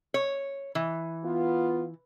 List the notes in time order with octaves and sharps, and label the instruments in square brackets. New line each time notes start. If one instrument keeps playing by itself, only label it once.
[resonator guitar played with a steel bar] C#5
E3
[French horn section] B3 F4